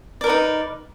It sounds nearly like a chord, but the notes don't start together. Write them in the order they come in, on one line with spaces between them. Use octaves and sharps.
D5 A#4 B4 D#4